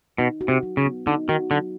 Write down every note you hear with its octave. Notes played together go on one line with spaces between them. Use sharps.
B2 D#4
F#4
C3
F#3
C#3
B3
D3 D#4
D#3 F#4
D3 F#3